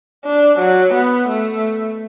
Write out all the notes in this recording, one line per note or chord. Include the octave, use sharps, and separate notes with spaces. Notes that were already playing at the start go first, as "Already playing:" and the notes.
D4
F#3
B3
A3